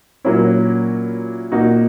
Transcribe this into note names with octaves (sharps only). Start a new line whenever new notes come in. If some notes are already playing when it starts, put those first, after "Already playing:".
A#2 F#3 A#3 C#4 E4
A#2 A#3 D#4 F#4